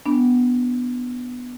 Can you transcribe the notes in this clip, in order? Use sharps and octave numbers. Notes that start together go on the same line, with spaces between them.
B3 D4